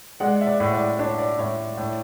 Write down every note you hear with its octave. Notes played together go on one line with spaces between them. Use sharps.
G#3 D5 F#5
E5
D5
A2
D5
D4 C#5
D5
A2 C#5
A2